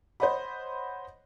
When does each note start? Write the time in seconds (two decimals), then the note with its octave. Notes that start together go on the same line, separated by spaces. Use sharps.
0.20 C5 C#5 D#5 F#5 B5